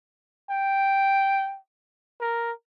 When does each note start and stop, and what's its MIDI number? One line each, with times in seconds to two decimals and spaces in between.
0.51 1.58 79
2.21 2.51 70